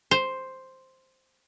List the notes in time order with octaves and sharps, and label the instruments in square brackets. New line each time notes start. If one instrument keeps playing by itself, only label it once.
[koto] C5